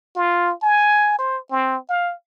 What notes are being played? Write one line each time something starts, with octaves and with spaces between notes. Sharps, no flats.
F4
G#5
C5
C4
F5